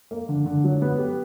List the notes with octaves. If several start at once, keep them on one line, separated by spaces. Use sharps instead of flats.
A#3
D3
D3
F#3
B3
G4